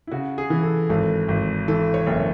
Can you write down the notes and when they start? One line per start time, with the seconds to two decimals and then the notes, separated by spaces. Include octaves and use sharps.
0.07 E4
0.11 C#3 F#4
0.38 G#4
0.50 E3
0.63 A4
0.89 G#1 A4
1.28 G#1
1.68 E3 A4
1.94 C#5
2.07 F#1